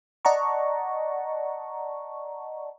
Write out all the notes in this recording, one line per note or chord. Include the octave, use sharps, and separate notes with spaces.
D5 D#5 F#5 A5 A#5 C#6